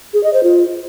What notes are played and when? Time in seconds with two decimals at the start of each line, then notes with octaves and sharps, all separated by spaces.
0.14 G#4
0.24 D#5
0.34 C5
0.43 F4